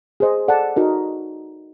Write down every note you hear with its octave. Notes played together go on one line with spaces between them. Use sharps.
G#4 C5 D#5
A4 D5 F#5 A5
D#4 F#4 A#4